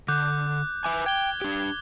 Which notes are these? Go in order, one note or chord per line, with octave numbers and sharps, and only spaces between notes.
D3 D6 F#6 G6
B4 E5 G#5 D6
G5 G#6 G7
D4 G4